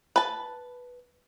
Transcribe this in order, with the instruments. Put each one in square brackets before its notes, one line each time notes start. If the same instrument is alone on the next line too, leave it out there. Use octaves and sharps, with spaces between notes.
[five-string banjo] B4 A5